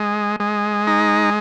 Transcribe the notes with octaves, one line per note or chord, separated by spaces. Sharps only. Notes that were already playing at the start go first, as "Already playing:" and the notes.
Already playing: G#3
G#3
D#4